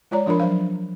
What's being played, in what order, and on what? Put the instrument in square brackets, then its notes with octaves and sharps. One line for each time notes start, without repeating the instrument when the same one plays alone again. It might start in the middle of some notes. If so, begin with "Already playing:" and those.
[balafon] G#3 F4 C#5 D5 A#5
F3 D4 F4 A#4 B5
F#3 C5 F5